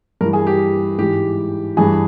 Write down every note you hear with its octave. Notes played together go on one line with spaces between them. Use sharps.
G2 E3 A#4
G#4
G4
G#2 E3 G4
G2 E3 G#4